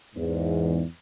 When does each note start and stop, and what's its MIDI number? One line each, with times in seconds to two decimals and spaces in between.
0.15 0.82 40
0.15 0.82 44